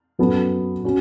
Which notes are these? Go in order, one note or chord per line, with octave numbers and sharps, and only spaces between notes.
F#2 F#3 B3 A4
C#4 F#4